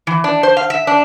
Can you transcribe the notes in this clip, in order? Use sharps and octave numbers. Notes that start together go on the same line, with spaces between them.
E3
D4
C5
F5
E5
D4